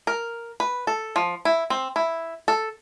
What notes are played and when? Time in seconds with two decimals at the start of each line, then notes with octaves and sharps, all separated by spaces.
0.07 A#4
0.60 B4
0.87 A4
1.16 F3
1.45 E4
1.70 C4
1.96 E4
2.48 A4